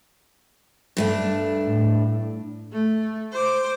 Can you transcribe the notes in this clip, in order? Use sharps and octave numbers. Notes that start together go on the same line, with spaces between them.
G2 A3 D4
A2
A3
C5 D6